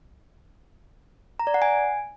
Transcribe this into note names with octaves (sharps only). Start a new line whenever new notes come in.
A#5
D5
F#5
G#5